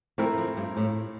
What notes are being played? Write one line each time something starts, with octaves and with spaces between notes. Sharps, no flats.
F3 A3 C4 E4 A#4
F3
G2
A2